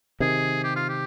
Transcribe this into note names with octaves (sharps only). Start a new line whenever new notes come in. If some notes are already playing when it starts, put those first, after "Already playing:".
C3 D#3 G#4
G4
F4
G4